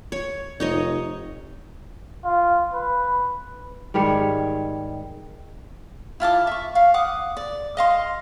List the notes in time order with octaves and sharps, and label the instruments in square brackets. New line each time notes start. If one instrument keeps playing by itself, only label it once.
[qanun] C#5
[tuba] F1 [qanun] D#4 C#5 D#5
[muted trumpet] F4
B4
[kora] G#2 D#3 G3 C#5
[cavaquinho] E4 F4 A5 D6
E5 C#6
F5
F#5 D6 D#6
D5
D#5 F5 C6